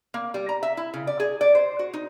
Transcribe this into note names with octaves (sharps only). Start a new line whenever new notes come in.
A#3
G3
A#5
E5
E4
C#3
D5
G#4
D5
C5
F#4
D#4